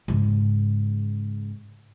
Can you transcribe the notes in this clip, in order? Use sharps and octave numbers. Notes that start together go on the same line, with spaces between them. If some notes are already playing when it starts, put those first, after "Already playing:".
G#2 C#3